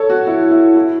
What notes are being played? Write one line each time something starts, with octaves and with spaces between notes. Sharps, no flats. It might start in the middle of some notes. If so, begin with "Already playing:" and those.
Already playing: A4 C#5
F#4
E4
E4
E4